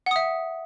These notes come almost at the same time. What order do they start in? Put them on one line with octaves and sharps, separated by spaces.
F#5 D#6 E5